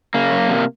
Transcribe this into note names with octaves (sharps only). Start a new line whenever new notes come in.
C#3 A#3
F#2
C3